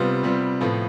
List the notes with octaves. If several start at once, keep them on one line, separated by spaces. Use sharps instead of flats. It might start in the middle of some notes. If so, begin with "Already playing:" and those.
Already playing: C3 G3 B3 F4
C3 G3 B3 F4
A2 F3 B3